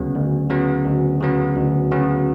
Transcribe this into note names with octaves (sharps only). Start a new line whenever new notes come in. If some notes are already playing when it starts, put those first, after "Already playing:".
Already playing: D2 C#3 F#3 B3
D2
C#3 F#3 B3
D2
C#3 F#3 B3
D2
C#3 F#3 B3